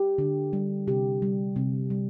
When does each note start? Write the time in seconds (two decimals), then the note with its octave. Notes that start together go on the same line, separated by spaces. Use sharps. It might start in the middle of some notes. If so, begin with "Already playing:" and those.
Already playing: G4
0.18 D3
0.53 G3
0.87 C3 G4
1.22 G3
1.56 C3
1.90 G3